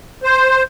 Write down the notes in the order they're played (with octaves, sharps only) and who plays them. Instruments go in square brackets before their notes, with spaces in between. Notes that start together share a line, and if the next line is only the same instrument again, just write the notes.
[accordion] C5